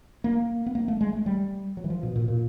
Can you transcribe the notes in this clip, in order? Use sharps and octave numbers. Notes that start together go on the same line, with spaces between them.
A#3
B3
A#3
A3
G#3
A3
G3
F#3
E3
F3
B2
A#2
A#2